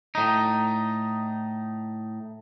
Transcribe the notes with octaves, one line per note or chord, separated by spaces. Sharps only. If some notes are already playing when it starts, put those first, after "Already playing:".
A2 D#4